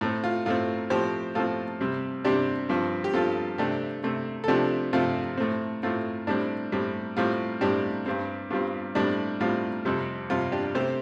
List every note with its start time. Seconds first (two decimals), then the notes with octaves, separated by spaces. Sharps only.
0.01 A2 A3 C4
0.24 F4
0.46 A2 A3 C4 F4
0.90 A2 F3 C4 G4 C5
1.35 A2 F3 C4 F4 A4
1.81 C3 G3 C4
2.25 C3 G3 C4 D4 G4
2.69 G2 F3 C4
3.04 G4
3.14 G2 F3 C4 F4 A4
3.58 C3 A3 C4 D4 G4
4.04 C3 A3 C4
4.44 A4
4.48 C3 F3 A3 C4 D4 G4
4.93 C3 F3 A3 C4 F4
5.37 A2 A3 C4
5.83 A2 A3 C4 F4
6.27 A2 G3 C4 D4
6.72 A2 G3 C4
7.17 A2 G3 C4 F4
7.61 A2 G3 C4 D4 G4
8.06 G2 G3 C4
8.50 G2 G3 C4 F4
8.95 A2 G3 C4 D4
9.40 A2 G3 C4 F4
9.85 F2 C3 G3 C4
10.30 F2 C3 G3 C4 F4
10.52 D4 G4
10.75 C3 A3 C4 G4 C5